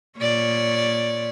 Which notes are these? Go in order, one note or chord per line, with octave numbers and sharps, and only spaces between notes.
A#2 C#5 D5